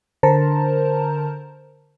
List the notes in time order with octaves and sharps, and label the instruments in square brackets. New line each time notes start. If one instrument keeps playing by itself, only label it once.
[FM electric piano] D3 A#4 C5 A5 A#5